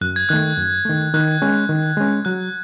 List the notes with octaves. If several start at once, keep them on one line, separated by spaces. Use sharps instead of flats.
F#2 F#6
G#6
D#3 A3 F#6
F#2
D#3 A3
D#3 F#6
G#3 C#4
D#3
G#3 C#4
F#3 F#6